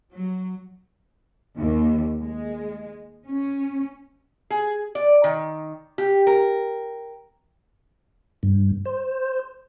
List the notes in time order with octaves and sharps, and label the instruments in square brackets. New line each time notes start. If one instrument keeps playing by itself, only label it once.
[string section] F#3
[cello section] D#2
G#3
C#4
[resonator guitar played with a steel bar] G#4
D5
D#3
G4
A#4
[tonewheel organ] G2
C5